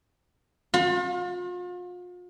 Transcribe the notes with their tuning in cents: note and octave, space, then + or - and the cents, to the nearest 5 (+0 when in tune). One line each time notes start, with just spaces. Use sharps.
F4 +40